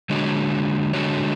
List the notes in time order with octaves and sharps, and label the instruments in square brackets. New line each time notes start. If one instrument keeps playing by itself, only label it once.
[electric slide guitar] D3 G#3 D4 F#4 C#5
D3 G#3 D4 F#4 C#5